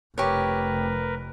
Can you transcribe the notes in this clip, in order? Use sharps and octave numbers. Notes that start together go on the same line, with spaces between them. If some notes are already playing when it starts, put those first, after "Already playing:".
F1 G4 A#4 B4 C#5